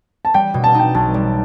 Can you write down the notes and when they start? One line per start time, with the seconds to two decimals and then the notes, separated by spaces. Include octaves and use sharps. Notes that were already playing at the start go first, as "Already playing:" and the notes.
0.25 A5
0.34 G3 G5
0.54 B2
0.64 A5
0.75 D#4 G5
0.95 B1 A5
1.14 G3